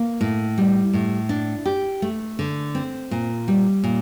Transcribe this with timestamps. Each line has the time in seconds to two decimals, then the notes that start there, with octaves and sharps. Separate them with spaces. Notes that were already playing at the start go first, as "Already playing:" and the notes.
Already playing: A#3
0.21 A2
0.58 G3
0.94 A2
1.29 D4
1.66 G4
2.02 A3
2.39 D3
2.75 C4
3.11 A#2
3.48 G3
3.84 A#2